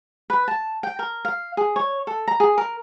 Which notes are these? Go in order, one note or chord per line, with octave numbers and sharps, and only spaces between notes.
B4
A5
G5
A#4
F5
G#4
C#5
A4
A#5
G#4
A#4